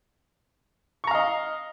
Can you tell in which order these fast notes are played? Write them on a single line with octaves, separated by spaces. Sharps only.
C#6 A#5 F5 D#5